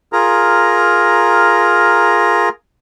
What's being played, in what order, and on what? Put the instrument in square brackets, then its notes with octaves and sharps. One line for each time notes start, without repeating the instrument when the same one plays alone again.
[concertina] F4 G#4 A#4 A#5